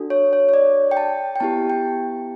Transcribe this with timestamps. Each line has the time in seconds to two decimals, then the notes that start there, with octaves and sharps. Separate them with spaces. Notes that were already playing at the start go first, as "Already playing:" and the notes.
Already playing: D4 F#4 A4
0.10 C#5
0.33 C#5
0.49 C#5
0.54 D5
0.91 G5
0.97 A5
1.36 G5
1.40 B3 E4 G4 A5
1.70 G5